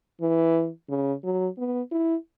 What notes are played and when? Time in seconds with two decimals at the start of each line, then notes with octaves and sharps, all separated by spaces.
0.21 E3
0.89 C#3
1.24 F#3
1.58 B3
1.92 E4